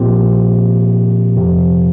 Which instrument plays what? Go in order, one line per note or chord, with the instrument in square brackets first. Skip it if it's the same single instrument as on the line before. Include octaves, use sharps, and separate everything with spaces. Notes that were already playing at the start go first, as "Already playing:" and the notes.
Already playing: [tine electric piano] A#2 F3 C4 G4
F2 C3 F3